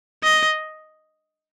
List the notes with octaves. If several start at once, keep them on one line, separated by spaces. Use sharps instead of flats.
D#5